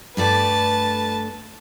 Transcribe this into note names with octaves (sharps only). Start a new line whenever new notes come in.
G2 A3 B4 D5 A5